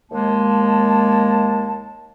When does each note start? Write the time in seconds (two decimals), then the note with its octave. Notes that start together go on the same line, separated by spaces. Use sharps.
0.10 D#2 G#3 A#3 A5